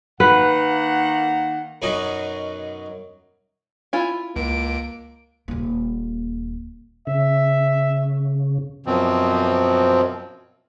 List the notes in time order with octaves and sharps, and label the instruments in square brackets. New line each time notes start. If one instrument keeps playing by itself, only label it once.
[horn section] D#3 A#3 F#5 [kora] B4
[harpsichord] F#2 B2 F#3 C#4 D#4 D#6
[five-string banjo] E4 F4 G#5
[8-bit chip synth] C#2 [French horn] A#3 [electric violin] D7
[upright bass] D#1 A#3
[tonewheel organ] C#3 [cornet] E5
[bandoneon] F#2 B2 F3 C4